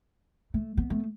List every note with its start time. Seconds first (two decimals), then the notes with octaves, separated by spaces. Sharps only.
0.54 A3
0.77 B3
0.90 A3